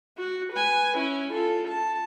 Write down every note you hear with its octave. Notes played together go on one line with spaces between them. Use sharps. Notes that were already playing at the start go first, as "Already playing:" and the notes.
F#4
B4 G#5
C#4 E4
F4 A4
A5